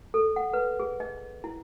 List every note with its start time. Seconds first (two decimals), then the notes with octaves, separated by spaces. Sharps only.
0.14 A4
0.36 F#5
0.53 B4
0.79 G#4
1.00 D#5
1.44 E4